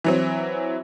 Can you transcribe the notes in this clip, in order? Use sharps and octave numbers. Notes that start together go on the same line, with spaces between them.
E3 F#3 C4